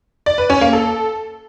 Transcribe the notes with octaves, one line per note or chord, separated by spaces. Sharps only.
D5
B4
C#4
A#3
A4